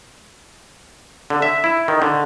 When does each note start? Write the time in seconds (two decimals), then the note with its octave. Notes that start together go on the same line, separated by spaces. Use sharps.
1.30 D3
1.42 E5
1.64 E4
1.88 D#3
2.02 D3